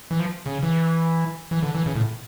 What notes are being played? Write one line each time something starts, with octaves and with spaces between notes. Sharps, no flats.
E3
F3
C#3
E3
E3
D3
E3
C#3
A2